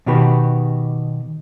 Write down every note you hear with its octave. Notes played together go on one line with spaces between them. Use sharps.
B2 D#3 F#4 G4 B4